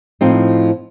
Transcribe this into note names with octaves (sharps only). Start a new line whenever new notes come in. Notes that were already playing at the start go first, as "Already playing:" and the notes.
A2 F3 C4 D#4